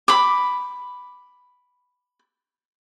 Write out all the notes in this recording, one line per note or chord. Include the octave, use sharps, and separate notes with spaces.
B5 D6